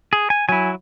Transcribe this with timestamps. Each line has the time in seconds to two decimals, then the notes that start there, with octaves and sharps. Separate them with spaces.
0.13 G#4
0.30 G#5
0.49 F#3 E4 G#5